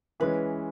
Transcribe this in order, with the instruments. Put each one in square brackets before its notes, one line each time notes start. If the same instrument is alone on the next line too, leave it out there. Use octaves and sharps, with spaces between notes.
[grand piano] E3 G#3 C#4 [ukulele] B4